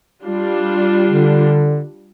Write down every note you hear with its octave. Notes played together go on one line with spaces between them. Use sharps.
G3 D4 F4
D3